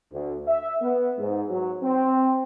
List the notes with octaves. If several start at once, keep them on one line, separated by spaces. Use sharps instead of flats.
D2
E5
B3
G#2
F#3
C4